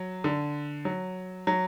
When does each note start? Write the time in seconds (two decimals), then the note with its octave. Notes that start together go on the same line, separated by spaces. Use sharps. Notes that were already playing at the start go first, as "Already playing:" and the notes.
Already playing: F#3
0.24 D3
0.85 F#3
1.47 F#3